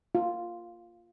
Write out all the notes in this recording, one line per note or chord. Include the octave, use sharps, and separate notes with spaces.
F4